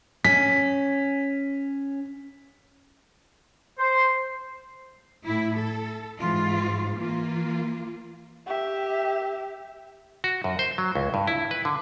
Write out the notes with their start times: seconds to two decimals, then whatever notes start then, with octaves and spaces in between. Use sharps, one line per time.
0.25 C#4 B6
3.78 C5
5.25 A2 E4
5.57 A4
6.19 G#2 E3 F4
6.96 E3 A#3 F4
8.47 G4 E5
10.24 F#4
10.44 F#2
10.59 C5
10.78 F#3
10.95 C#2
11.14 G2
11.27 E4
11.51 B4
11.65 D3